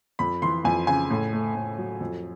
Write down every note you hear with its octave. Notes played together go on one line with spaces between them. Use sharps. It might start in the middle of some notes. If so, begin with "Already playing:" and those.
F2 B5
E3 C6
F2 G#5
C#3 G#5
A2
A3
A2
F#3
F2